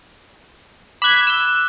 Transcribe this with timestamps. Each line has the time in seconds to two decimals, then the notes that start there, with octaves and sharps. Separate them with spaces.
1.02 B5 D6 F#6 G#6
1.27 E6 E7 G7